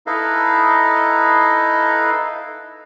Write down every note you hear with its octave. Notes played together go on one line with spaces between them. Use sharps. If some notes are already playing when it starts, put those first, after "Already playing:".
D#4 E4 A4 B4 D#5 F5